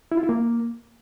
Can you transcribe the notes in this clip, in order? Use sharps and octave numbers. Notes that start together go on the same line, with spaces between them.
E4
F4
E4
A#3